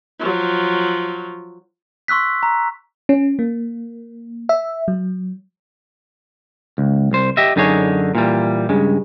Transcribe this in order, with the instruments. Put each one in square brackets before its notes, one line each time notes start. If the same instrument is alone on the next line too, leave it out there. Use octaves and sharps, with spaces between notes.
[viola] F3 F#3
[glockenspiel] C6 C#6 E6 F#6 B6
A#5
[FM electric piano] C#4
A#3
E5
F#3
[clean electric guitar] C#2
C2 C5
G4 D#5 E5
F#2 D3 D#4 G#4 C#5
A#2 E3 G3
G2 C#3 G#3